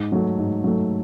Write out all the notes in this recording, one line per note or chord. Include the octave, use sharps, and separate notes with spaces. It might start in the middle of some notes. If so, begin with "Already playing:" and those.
Already playing: G#2
F#3 A3
G#2
F#3 A3